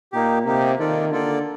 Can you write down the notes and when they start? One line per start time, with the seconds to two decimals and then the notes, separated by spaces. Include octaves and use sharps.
0.12 A#2 A#3 D#4 G4
0.45 C3 A#3 D#4 G4
0.79 D#3 A#3 F4 A4 D5
1.12 D3 A#3 F4 A4 D5